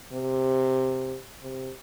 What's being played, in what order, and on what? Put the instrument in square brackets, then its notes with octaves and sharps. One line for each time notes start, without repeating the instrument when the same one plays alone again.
[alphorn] C3
C3